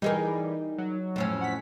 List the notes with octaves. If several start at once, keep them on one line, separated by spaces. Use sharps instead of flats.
E3 G3 D#4 G#4 A#4
F#3
F2 A2 C#4
F#5 B6